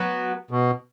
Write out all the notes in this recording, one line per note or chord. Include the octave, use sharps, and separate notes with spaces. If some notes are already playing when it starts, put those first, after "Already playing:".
Already playing: F#3 B3 F#4 B4
B2